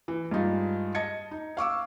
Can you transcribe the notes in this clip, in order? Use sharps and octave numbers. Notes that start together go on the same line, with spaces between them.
E3
G2 G#3 D#4 F4
D#5 A5 G#6 C#7
D#4
F5 C#6 D6 E6